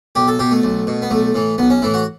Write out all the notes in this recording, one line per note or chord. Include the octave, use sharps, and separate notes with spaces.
B1 G4
A4
B2 G4
A3
B1
B2
B3
B1 A3
A2 E3
B1 B3
C#4
A2 E3 E4
F#4